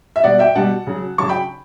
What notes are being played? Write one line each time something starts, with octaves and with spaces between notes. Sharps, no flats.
E5
B2 G3 D5 F#5
E5 G5
B2 G3 F#5 A5
C#3 F#3
C#3 F#3 A5 C#6
G5 B5